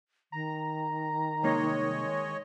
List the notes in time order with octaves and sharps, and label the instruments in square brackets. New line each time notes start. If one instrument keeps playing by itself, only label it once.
[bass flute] D#3 [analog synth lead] A#5
[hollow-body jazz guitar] C2 A#3 D#4 [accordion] G#3 C#5 D#5